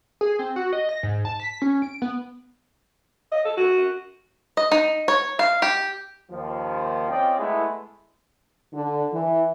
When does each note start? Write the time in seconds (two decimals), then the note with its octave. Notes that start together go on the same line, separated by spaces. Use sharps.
0.21 G#4
0.39 C4
0.56 F#4
0.73 D#5
0.89 A#6
1.03 G#2
1.25 A5
1.40 B6
1.62 C#4
1.82 D7
2.02 B3
3.32 D#5
3.45 A4
3.57 F#4
4.57 D#5
4.72 D#4
5.08 C#5
5.39 F5
5.62 G4
6.31 D#2 F3
7.10 C4 C#4 F4 D5 D#5 G5
7.39 G#3 A3 B3 E4
8.74 D3
9.13 E3